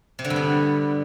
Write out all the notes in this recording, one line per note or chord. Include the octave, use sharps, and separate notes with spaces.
C3
D3
G2
B3